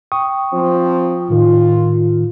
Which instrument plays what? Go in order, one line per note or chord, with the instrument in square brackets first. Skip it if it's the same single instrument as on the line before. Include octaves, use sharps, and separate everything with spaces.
[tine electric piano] G5 C#6 D#6
[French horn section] F3 C4
[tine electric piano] A2 D#3 [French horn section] F4